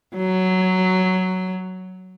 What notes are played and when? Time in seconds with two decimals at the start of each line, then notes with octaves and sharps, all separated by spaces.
0.16 F#3